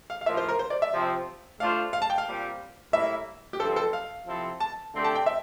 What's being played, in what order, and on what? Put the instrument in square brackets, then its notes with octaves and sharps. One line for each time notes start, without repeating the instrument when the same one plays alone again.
[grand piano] F5
F5
[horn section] A2 F3 A#3 F4 [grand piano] E5
[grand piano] C5
A#4
C5
D5
E5
[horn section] C3 F3 C4
[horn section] A3 D4 F4 C5 [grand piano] F5
[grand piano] F5
A5
G5
F5
[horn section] A#2 G3 C4 G4
[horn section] A2 G3 A#3 E4 [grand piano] E5
[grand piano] G4
[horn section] G2 F3 C4 [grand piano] A4
[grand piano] A4
F5
[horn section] C3 F3 C4 E4 A4
[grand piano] A5
[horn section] D3 A3 C4 G4 D5
[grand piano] A5
G5
E5